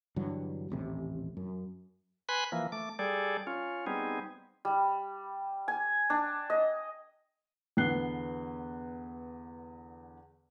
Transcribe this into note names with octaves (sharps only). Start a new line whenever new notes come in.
G2 D3 E3 F#3
D#1 A1 C3
F#2
B4 G#5 B5 C6 F#6
E3 F3 A#3
A3 D6
G3 G#4 A4 D5
C#4 F4
G3 B3 C4 D#4 G#4
G3
G#5
D4
D#5
E2 D3 B3 F#6 C7 G7